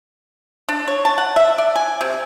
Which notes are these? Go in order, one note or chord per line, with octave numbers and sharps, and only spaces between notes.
D4
C#5
A5
F#5
E5
D5
G#5
C3